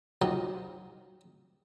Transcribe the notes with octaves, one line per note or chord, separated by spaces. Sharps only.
D#3 F3 F#3 D#4 G4